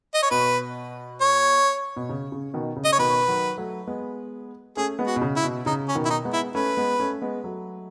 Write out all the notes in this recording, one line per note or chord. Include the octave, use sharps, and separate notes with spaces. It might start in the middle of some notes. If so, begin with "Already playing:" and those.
D#5
C#5
B2 B4
C#5
B2
C#3
C#3
B2 D#3
C#3
D#5
C#5
B2 D#3 B4
D#3 F#3
F#3 A3
G#3 B3
A3 C#4 G#4
G#3 B3
F#4
B2
C#3
E4
B2
C#3 D#4
C#4
B2 D#3
E4
D#4
G#3 B3
E4
A3 C#4 B4
G#3 B3
A3 C#4
G#3 B3
F#3 A3